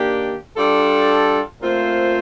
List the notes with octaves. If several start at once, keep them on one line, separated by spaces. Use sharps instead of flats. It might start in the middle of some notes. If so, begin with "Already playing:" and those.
Already playing: D#3 A#3 D4 G4
G3 D4 F4 A4
A#2 A3 C4 F4 C5